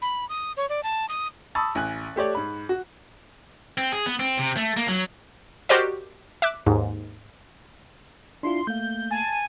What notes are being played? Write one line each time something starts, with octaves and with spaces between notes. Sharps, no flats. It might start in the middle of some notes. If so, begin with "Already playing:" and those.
B5
D#6
C#5
D5
A5
D#6
A5 B5 C#6 D#6 E6 A6
A1 G#5 F#6
A3 G4 C#5 D5
G#2 B5
F#4
C4
G#4
B3
C4
C3
A3
A#3
F#3
F#4 G4 A#4 C5 D5 D#5
E5 D6 F#6
D#2 G#2
D4 E4 F4 C6
A3 A#3 F5 G6
G#5 A5